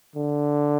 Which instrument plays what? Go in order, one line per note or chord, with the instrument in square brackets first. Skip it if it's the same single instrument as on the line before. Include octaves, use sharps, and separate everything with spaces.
[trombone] D3